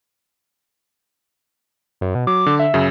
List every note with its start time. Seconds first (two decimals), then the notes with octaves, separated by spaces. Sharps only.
2.01 F#2
2.15 B2
2.27 F#3 D6
2.46 D3
2.59 E5
2.74 F#2 C#3